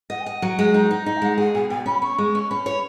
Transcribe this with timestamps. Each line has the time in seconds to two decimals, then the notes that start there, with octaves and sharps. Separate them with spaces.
0.10 D#5 F#5
0.21 G#5
0.26 D#5 F#5
0.42 F#3
0.59 G#3
0.74 D#4
0.91 D#4
1.06 D#4 D#5
1.17 G#5
1.22 G#3 F#5
1.38 G#4 F#5
1.54 B2 G#5
1.70 B2 G#5
1.86 C#4 B5
2.02 C#4 C#6
2.18 G#3
2.35 C#4
2.50 C#4 B5
2.66 C#5